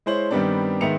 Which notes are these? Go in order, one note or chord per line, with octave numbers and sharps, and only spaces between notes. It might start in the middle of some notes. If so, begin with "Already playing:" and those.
G#3 E4 C5 C#5 F#7
G2 D#3 G3 B3 C4 D4
G#2 D#3 B3 E5 C#7 F7